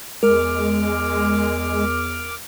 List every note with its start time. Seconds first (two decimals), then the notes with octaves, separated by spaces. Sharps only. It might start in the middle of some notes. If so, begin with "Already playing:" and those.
0.23 E2 G#3 A#4 D6 F6